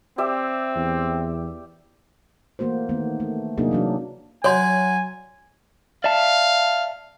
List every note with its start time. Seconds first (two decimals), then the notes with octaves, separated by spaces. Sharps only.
0.18 C4 G4 D5 E5
0.76 E2
2.59 E3 A3 A#3 F#4 C5
2.89 D#3 A3 B3
3.20 A3
3.58 C3 F#3 A#3 D4 D#4 G#4
3.71 E3 F#3 D4
4.44 F#3 C#5 D5 G#5 C6
6.04 D5 E5 F5 A5